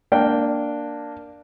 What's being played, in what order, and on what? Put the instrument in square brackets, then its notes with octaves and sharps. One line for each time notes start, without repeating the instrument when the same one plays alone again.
[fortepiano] A#3 D4 G5